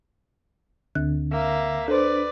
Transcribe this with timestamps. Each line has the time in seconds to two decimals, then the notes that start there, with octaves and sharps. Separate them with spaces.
0.95 D2 D3 F#6
1.32 A#3 E5
1.88 D4 A4 B4 C5 D5